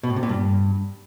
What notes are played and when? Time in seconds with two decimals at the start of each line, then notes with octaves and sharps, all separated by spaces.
0.03 B2
0.10 A2
0.16 C3
0.23 A#2
0.29 G2